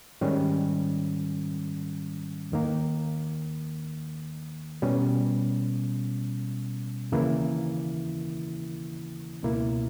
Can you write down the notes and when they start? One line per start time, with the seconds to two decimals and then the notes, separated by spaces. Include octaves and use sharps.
0.21 G#2 D#3 G3 C#4
2.52 D#2 D#3 A#3
4.82 B2 G3 C#4
7.12 D#2 C#3 E3 A#3 E4
9.43 C#2 B2 A#3 E4